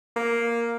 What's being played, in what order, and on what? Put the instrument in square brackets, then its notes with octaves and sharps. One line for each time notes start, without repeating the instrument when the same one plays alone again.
[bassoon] A#3